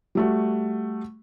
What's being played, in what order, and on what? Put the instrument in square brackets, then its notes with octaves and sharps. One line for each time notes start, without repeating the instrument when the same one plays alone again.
[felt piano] G3 A3 F#4